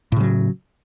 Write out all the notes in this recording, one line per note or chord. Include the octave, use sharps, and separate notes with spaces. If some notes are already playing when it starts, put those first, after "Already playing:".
A2 C#3 F#3